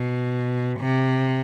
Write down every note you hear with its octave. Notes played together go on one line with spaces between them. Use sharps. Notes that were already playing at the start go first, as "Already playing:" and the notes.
Already playing: B2
C3